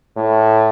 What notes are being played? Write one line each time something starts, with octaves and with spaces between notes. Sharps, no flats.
A2